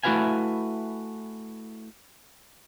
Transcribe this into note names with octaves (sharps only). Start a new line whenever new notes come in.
A3 E4 F#4 B4 F5 G#5